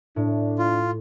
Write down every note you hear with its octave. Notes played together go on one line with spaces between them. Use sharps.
A2 D4
F4